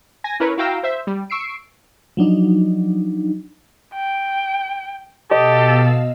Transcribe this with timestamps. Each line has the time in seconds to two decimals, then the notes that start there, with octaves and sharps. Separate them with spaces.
0.24 G#5 A#6
0.40 C#4 E4 A#4 B4 C#5
0.58 E4 F#4 F5 G5 A#5 E6
0.83 C5 E5
1.07 G3
1.30 C#6 E6 C7 D7
2.17 F3 F#3 D4 D#4
3.94 G5
5.31 B2 G4 A4 D#5 F5 E6